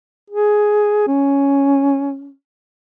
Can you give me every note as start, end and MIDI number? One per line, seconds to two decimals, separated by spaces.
0.30 1.03 68
1.08 2.33 61